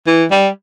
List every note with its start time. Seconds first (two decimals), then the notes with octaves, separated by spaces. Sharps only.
0.07 E3
0.31 G3